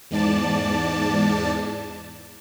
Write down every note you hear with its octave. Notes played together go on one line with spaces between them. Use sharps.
E2 G#2 D5 A5